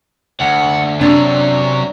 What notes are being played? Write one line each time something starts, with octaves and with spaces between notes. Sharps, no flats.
D2 F#5
F#2 C3 F#3 D4